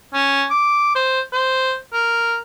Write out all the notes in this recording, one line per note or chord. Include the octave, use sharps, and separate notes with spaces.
C#4
D6
C5
C5
A#4